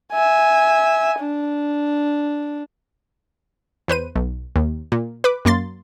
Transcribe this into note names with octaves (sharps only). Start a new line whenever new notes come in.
E5 G#5
D4
E2 B4 C5 D#7
B1
D#2
A#2
B4 D6
F#2 A#3 C6 A6